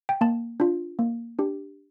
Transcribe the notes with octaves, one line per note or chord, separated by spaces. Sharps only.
G5
A#3 A5
D4 F4
A#3
D4 G4